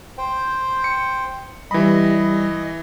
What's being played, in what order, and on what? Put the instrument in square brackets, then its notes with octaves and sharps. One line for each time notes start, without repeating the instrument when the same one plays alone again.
[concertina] C5 G5
[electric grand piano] C#7
[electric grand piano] E3 B5 [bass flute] G3 [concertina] D#5